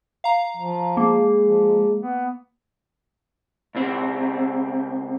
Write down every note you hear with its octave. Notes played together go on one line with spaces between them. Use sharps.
F5 A#5
F3
G#3 A#3
F3
B3
C#2 C4